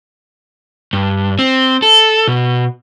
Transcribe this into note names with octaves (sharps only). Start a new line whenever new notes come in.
G2
C4
A4
B2